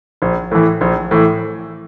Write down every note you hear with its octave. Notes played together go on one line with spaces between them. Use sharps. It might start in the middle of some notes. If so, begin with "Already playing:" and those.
A#1
A2 E3
A#1
A2 E3